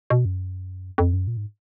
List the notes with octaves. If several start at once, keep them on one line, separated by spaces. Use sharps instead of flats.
B2
F#2
F2
F#2
A#2
G#2